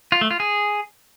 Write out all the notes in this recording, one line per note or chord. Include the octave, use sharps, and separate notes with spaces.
F4
A3
F4
G#4